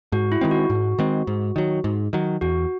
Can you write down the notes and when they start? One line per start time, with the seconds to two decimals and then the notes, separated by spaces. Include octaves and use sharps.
0.12 G#2 F#4
0.32 E4
0.41 D#3 G#3 C4
0.51 F#4
0.70 G#2
0.98 D#3 G#3 C4
1.27 G#2
1.56 D#3 F#3
1.84 G#2
2.13 D#3 F#3
2.41 E2 F#4